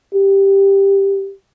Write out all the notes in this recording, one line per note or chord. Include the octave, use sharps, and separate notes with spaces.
G4